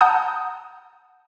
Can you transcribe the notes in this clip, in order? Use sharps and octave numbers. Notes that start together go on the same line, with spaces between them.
F#5 A5 A#5 D#6 G6